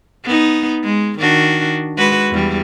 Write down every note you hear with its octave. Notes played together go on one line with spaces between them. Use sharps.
B3 D#4
G#3
D#3 D4 F#4
G#3 F#4 B4
E2 G3